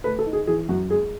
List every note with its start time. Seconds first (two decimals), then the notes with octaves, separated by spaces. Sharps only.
0.04 A3 B4
0.19 A4
0.26 D#4
0.33 G#4
0.47 E3 G#4
0.69 F#2 F#4
0.90 G#3 G#4